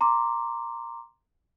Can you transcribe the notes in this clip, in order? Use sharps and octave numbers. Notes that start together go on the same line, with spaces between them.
A#5 C6 D6